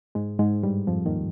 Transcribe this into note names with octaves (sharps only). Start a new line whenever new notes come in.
G#2 G#3
G#2 G#3
G2 G3
F2 F3
D#2 D#3